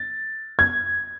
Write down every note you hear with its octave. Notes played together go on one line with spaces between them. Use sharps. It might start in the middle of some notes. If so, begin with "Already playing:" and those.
Already playing: A6
G#6